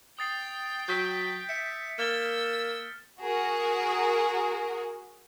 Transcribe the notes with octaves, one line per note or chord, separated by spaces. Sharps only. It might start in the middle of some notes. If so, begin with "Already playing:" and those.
G5 D#6 A6 C7
F#3 G6 B6 D7
E5 C#7
A#3 E6 F6 A6 G7
F#4 G#4 A#4